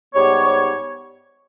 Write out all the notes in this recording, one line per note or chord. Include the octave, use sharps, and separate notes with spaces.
G#2 G3 B3 G4 C#5